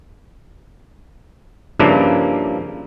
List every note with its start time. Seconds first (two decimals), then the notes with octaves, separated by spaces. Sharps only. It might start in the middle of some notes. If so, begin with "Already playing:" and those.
1.79 G2 C#3 F3 A#3 D4 E4